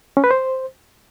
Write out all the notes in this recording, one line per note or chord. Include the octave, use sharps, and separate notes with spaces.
C#4
B4
C5